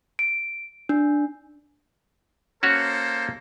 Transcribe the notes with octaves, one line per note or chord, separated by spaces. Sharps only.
D7
D4
A#3 C#4 F#4 A4 C5 C#5